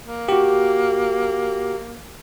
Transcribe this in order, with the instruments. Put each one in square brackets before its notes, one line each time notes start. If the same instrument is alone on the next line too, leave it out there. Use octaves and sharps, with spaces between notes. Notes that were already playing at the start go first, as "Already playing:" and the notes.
[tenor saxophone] A#3
[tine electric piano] F#4 G4